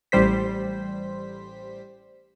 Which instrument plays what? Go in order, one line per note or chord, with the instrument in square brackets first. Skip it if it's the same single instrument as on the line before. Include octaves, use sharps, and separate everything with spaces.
[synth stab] A1 G3 C5 B6